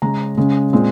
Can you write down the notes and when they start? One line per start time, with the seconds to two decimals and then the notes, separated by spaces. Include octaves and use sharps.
0.02 C#3 G#3 C#4 A#5
0.37 C#3 G#3 C#4
0.73 A#2 G#3 C4